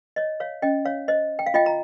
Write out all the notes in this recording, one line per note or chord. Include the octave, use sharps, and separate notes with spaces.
C#5 D#5
C#5 F5
C#4 D#5 G5
C#5 F5
C5 D#5
G5
F5
F4 D#5 G5
A#5